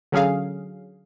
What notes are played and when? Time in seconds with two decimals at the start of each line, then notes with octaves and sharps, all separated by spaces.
0.12 D3 F#3 C#4 G#4 F5